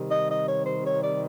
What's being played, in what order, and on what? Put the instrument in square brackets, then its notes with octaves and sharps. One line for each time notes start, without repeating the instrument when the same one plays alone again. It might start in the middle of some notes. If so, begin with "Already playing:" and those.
Already playing: [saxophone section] C3 D#3 G3
D#5
D#5
C#5
C5
C#5
D5